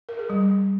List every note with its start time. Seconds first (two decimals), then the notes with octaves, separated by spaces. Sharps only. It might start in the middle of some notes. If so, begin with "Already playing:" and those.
0.09 A#4
0.19 G#4
0.30 G3